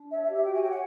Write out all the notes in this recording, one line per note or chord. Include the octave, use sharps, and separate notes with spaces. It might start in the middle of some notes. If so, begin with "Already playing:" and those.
Already playing: D4
C#5 E5
E5
G4
E5
F#4 G5
G#5
C#5 G5
F#5